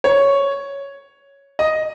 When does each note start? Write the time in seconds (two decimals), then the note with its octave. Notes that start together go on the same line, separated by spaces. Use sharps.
0.04 C#5
1.59 D#5